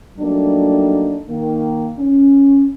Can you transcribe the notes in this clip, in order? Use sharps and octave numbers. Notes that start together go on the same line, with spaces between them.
F#3 G3 A3 A#3 D4 D#4
D#3 A#3
C#4